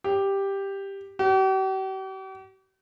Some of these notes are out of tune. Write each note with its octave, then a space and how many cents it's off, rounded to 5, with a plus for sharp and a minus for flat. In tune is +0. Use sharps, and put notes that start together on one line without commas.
G4 +5
G4 -45